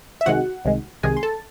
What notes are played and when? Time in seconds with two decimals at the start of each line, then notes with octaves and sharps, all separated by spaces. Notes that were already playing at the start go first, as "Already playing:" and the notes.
0.21 E5
0.26 C2 C3 D#3 G#3 F#4 F#5
0.65 C2 C3 D#3 G#3
1.03 C2 C3 D#3 G#3 G#4 G#5
1.17 C6
1.23 A4 A5